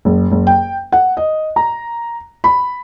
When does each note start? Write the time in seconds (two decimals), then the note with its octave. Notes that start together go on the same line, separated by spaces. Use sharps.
0.05 F#1
0.31 F#1
0.47 G5
0.92 F#5
1.17 D#5
1.56 A#5
2.44 B5